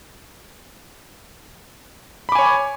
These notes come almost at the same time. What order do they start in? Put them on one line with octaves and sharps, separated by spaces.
B5 D6 G#5 C#5